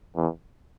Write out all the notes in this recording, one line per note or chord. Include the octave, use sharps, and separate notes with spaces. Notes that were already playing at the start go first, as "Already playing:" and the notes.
E2